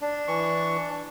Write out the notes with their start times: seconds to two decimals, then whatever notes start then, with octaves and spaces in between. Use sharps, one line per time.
0.01 D4
0.28 E3 C#6